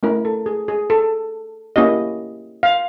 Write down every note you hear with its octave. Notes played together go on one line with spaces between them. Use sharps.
A3 C#4 E4 A#4
A4
G#4
G#4
A4
A#3 C#4 E4 G4 D#5
F5